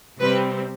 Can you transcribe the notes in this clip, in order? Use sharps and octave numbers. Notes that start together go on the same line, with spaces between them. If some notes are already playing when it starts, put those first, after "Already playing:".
C3 G3 C4 B4